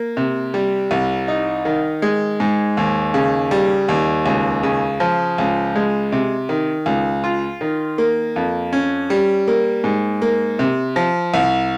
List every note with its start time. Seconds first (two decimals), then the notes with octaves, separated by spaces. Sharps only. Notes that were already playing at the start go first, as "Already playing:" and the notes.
Already playing: A#3
0.17 C3
0.54 G3
0.91 C2
1.28 D#4
1.65 D#3
2.02 G#3
2.40 G#2
2.77 D#2
3.14 C#3
3.51 G3
3.88 D#2
4.26 C#2
4.63 C#3
5.00 F3
5.38 C#2
5.76 G#3
6.12 C3
6.49 D#3
6.86 C#2
7.24 F4
7.61 D#3
7.98 A#3
8.36 F2
8.73 C#4
9.10 G3
9.48 A#3
9.84 G#2
10.22 A#3
10.59 C3
10.96 F3
11.34 C2